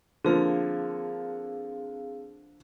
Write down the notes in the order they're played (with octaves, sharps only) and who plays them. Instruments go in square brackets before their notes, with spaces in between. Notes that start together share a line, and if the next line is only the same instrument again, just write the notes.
[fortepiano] D3 F3 A#3 [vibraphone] C4 G#4 F5